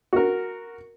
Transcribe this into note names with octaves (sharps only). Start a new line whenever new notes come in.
F#4 A#4